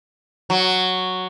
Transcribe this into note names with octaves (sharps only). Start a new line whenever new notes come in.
F#3